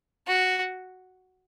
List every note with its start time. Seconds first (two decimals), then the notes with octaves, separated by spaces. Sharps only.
0.27 F#4